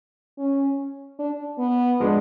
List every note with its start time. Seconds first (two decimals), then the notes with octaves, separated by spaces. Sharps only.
0.38 C#4
1.19 D4
1.59 B3
2.00 F3 G#3 B3 D4